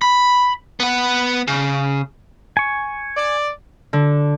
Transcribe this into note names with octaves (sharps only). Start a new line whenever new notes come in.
B5
B3 F#5
C#3
G#5 C#6
D5
D3